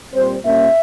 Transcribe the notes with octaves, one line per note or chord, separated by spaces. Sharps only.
A#2 G3 C4 C5
A#2 G3 A#3 C#4 E5